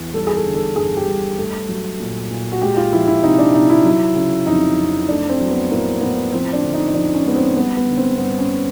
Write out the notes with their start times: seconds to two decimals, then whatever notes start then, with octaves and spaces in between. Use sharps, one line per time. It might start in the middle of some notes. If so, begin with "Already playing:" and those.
Already playing: E2
0.14 G3 A4
0.27 G#4
0.35 A4
0.45 D3
0.55 A4
0.76 G2 G#4
0.97 G4
1.07 G2
1.38 A3
1.69 F#3
2.00 A#2
2.30 A#2
2.52 F#4
2.62 G#3 G4
2.77 F4
2.92 F3 E4
3.07 E4
3.23 C3 D#4
3.38 D4
3.54 C3 D#4
3.70 E4
3.84 F#3
4.15 C#3
4.47 F2 D#4
4.78 F2
5.08 A3 D4
5.30 C4
5.40 F#3
5.50 B3
5.70 A2 A#3
6.01 A2 B3
6.32 F3 C4
6.53 D4
6.64 D3
6.74 D#4
6.88 D#4
6.94 F2 D4
7.15 C#4
7.25 G#3 B3
7.36 C4
7.56 G3 B3
7.77 B3
7.87 D3
7.97 C4
8.18 G2 B3
8.39 C#4